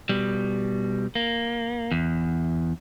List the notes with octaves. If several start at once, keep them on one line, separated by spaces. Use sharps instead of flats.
B2 G3
A#3
E2